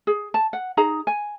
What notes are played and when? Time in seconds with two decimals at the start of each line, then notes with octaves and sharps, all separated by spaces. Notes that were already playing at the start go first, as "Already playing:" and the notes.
0.07 G#4
0.34 A5
0.53 F#5
0.77 D#4 G#4 A#5
1.07 G#5